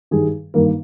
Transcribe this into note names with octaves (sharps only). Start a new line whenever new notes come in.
G2 D#3 G3 G#4
G2 D#3 A#3 A#4